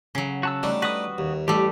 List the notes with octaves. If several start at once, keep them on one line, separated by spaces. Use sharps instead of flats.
C#3 F#3
F#4 A5 E6
G3 A3 D4 D#4
F#4 B4 D#6
D#2
A1 G3 A3 G4